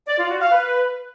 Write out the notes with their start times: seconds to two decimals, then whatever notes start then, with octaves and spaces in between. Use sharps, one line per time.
0.07 D5
0.19 F4
0.30 F#4
0.41 F5
0.52 B4